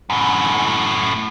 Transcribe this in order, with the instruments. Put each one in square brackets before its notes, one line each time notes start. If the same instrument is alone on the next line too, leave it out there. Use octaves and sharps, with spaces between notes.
[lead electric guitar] F#2 A2